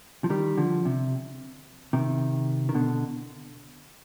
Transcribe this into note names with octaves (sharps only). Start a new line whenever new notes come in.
F3
D#3 G3
D3 F3
C3
C3 D#3
D#3
B2 D3